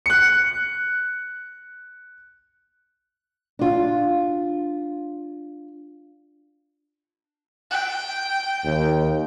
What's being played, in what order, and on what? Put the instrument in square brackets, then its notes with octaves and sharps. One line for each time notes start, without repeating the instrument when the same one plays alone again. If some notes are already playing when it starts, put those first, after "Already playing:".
[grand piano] F#6 C#7
[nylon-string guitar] D4 F4
[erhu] G5
[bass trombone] D#2